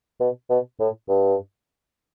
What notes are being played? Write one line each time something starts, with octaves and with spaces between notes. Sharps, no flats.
B2
B2
A2
G2